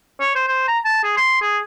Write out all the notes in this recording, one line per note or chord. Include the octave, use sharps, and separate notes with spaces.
C#5
C5
C5
A#5
A5
G#4
C6
G#4